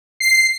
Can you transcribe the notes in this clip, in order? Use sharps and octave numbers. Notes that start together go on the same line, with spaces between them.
C7